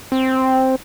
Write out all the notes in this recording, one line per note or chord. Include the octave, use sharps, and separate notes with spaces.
C4